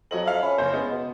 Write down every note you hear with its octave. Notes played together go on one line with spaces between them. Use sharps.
F2 F#3 D#5 F#7
E5 F5
C#4 B5
F#1 C#3 C5
G#3 B3
B2